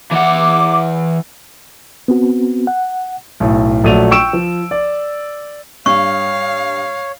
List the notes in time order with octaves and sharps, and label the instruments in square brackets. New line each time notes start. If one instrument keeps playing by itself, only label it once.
[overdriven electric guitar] E3 F#5 [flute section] D6
[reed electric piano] B3 C4 F#4
F#5
[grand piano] B1 A2
A#1 F#3 A3 D5 D#7 F7
G5 C#6 E6 D7 E7
F3
D5
[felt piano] G2 D4 [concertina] C#5 [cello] F5 [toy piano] C#6